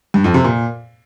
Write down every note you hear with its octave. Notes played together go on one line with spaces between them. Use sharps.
G2
F2
C3
A#2